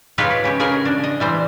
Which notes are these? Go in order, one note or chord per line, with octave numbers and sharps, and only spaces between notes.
D#4 F4 G4 G#4 B4 C#5
C#3 G4 C#5
C#3 G#4 A#4 C#5 G#5
D4
D#5
E3 G3 C5